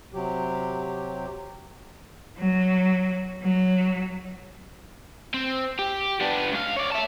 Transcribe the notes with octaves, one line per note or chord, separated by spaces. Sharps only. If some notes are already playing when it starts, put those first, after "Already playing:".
C3 F#3 G4
F#3
F#3
C4
G4
B3 D4
C#2 F5
C#5 D5
E5 A5